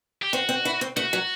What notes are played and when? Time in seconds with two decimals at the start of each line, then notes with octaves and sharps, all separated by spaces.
0.22 G4
0.33 C4 F#4
0.49 C4
0.65 E4
0.81 C4
0.97 A3 F#4
1.13 F#3